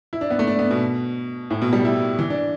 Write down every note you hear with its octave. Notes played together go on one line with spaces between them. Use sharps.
E4
D4
B3
A3
D4
B3
B2
A2
B2
G3
E4
E3
D4